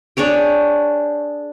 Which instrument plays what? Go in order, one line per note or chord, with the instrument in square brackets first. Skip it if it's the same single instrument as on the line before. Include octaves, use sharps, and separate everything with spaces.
[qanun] D4 G#4 C#5 G5